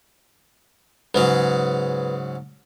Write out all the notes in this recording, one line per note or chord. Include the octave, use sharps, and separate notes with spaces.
G#2 C#3 F#3 B4